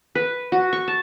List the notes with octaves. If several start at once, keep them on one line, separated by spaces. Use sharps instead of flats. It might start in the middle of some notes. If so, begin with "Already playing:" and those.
B4
F#4
C#6
A5